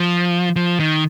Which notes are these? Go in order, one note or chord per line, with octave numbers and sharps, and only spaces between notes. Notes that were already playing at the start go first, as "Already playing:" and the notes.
Already playing: F3
F3
D#3